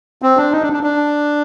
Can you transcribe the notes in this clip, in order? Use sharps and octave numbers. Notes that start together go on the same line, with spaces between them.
C4
D4
D#4
D4
D4
D4